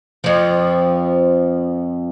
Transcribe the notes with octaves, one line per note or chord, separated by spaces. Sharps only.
F2 F3